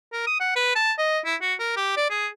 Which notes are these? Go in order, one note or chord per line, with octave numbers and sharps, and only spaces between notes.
A#4
D#6
F#5
B4
A5
D#5
E4
F#4
A#4
G4
D5
G#4